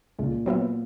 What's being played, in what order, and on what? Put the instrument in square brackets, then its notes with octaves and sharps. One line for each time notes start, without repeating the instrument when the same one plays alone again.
[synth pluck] C#2 C#3 G#3 [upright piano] A#2
[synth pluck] F#3 B3 F#4 B4 E5